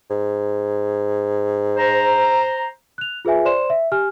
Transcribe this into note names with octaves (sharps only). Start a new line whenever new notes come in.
G#2
C5 A#5
F#6 F7
F4 G#4 B4 E5 G#5
C5 D5 C6 E7
E5
G4 G#5 F6